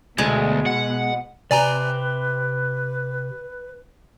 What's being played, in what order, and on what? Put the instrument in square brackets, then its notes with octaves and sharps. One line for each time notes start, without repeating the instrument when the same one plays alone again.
[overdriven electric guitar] D2 [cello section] B2 [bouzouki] G#3
[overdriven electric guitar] F#5
[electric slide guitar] C3 G4 [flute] B4 [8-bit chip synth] D5 G#5 A#5